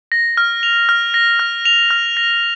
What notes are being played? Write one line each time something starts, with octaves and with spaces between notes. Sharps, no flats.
A#6
F6
F7
F6
A#6
F6
F7
F6
A#6